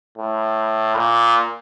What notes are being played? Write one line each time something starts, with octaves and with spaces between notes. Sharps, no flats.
A2
A#2